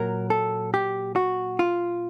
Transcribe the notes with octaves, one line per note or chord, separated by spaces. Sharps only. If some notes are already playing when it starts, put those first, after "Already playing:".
Already playing: A#2 F#3 A#4
A4
G4
F#4
F4